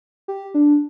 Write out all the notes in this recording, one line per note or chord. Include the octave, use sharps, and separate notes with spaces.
G4
D4